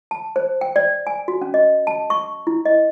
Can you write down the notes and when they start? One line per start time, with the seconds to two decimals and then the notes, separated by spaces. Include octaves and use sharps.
0.11 A5
0.36 C5
0.61 G5
0.76 D5
1.07 G#5
1.28 F#4
1.42 C#4
1.54 D#5
1.87 A5
2.10 C#6
2.47 E4
2.65 D#5